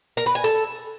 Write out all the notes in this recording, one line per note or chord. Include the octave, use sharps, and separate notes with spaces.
A#4
B4
G#5
A4